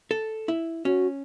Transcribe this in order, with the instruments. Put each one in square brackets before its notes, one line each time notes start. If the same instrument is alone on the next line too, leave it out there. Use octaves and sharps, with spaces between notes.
[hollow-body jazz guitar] A4
E4
[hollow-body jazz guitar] C#4 [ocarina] F#4